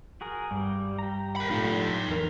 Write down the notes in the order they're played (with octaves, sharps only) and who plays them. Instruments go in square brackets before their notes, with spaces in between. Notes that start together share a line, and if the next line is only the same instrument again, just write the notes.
[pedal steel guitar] F#4 G#4 A#4
[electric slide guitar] G2 [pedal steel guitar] G3
[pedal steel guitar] G4 A#5
[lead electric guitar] A#4 B5
[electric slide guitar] A2 F4 [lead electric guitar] D#4 A4
[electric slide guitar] E2 A#4